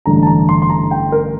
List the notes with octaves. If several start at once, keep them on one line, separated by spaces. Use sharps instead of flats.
A1 G2 D3 A3 D4 A#5
A5
A#5
C6
C6
A#5
G5
A#4